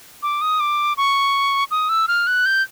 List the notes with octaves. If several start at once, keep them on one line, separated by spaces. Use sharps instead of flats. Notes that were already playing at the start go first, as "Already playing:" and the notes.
D6
D#6
D6
C#6
D#6
E6
F6
F#6
G6